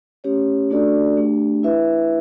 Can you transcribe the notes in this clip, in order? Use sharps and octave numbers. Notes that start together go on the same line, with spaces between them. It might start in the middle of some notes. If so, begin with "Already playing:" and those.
A3 C#4 G4 C#5
A3 D4 F#4 A4 D5
A3 D4 G4
E4 B4 E5